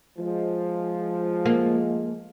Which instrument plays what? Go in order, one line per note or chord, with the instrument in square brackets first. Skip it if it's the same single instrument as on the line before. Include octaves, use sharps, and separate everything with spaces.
[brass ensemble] F3 G#3
[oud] A#3